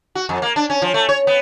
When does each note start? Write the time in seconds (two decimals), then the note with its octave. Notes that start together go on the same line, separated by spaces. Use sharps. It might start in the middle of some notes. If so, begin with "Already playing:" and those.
0.15 F#4
0.29 F2
0.42 A#3
0.56 D4
0.70 C#4
0.82 F3
0.94 A3
1.09 C#5
1.27 B3